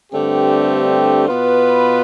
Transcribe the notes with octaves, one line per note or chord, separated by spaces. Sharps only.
G2 D3 A3 C4 G4
B2 B3 F4 B4